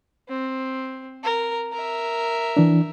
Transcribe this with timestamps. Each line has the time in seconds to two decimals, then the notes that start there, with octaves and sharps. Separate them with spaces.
0.29 C4
1.24 A#4
1.72 A#4 E5
2.57 E3 D4